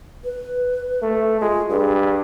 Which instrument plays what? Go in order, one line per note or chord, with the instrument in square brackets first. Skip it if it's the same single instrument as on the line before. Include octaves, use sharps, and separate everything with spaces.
[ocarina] B4
[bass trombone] A3
[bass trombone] G#3 [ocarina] F4
[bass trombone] G2 [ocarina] G#4